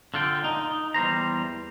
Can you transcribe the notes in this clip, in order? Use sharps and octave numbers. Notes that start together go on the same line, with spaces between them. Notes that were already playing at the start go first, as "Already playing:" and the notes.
D3 F4 G5
D#4
E2 G3 C5 A#5